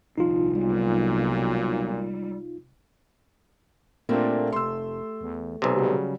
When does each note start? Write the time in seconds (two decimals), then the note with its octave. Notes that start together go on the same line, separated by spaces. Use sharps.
0.18 D#1 C2 F3 D#4 F4
0.55 B1 A#2 G3 G#3
4.09 A#2 A3 A#3 C4 D4 G4
4.52 F1 C6 E6
5.21 E2
5.62 B1 C3
5.76 C#3 F#3 G3